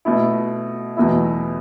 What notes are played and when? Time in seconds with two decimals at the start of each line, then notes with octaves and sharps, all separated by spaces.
0.05 B2 A3 E4
0.97 E2 B2 F#3 A3 E4